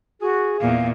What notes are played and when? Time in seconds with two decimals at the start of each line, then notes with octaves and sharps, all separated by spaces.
0.21 F#4 G#4
0.60 E2 A#2 F5